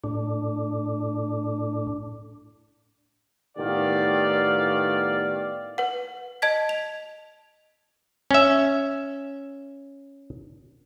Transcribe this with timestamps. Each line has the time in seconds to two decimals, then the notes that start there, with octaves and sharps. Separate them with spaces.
0.04 A2 D4
3.58 A2 D#3 B3 G4 D5 F5
5.78 B4 F#5
6.42 D#5 A5 G#6 B6
6.69 F7
8.31 C#4 E5